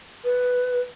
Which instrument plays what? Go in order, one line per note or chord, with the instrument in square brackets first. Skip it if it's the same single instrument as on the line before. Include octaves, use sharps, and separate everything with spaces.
[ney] B4